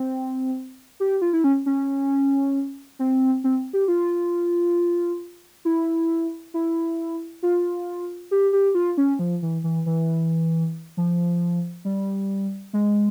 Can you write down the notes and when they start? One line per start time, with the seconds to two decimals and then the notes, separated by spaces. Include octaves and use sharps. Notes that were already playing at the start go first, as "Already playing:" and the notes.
Already playing: C4
1.00 G4
1.22 F4
1.33 E4
1.44 C#4
1.66 C#4
2.99 C4
3.44 C4
3.73 G4
3.88 F4
5.65 E4
6.54 E4
7.43 F4
8.31 G4
8.53 G4
8.75 F4
8.97 C#4
9.19 F3
9.42 E3
9.64 E3
9.86 E3
10.97 F3
11.85 G3
12.73 G#3